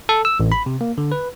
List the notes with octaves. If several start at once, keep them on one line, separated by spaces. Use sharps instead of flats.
A4
E6
A1
B5
C3
A#3
D3
B4